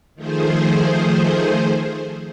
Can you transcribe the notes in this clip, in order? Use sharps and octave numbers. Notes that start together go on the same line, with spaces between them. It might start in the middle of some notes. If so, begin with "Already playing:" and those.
D#3 F3 A3 G#4 C5